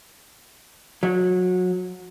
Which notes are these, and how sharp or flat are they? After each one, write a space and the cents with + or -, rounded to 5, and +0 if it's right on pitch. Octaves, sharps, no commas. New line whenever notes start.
F#3 -25